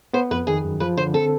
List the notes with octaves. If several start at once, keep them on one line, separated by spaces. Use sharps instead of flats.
B3 C5
F2 B4
D#3 G#4
F#2
F3 B4
D3 C5
C4 A4